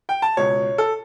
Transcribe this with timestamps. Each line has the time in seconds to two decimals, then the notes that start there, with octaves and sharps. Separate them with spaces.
0.09 G5
0.22 A5
0.37 C#2 B2 C#5
0.78 A4